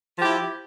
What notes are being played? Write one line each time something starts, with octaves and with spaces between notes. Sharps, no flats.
F3 E4 G4